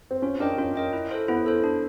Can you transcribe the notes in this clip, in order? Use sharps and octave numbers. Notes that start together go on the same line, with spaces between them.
C4
C#4 F4
D4 A#4 D#5 G5
C#4 F4
A#4 D#5 G5
E4
A4 C5
B3 E4
A4 C5
D4